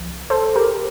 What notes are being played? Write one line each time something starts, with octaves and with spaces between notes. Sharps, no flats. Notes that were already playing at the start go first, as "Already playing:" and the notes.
Already playing: C2 F3
A4 C5
G4 A#4